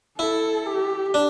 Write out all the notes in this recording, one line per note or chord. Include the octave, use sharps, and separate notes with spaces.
E4 A4
G4
D4